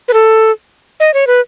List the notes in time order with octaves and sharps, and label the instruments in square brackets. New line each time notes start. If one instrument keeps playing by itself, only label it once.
[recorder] B4
A4
D#5
C#5
B4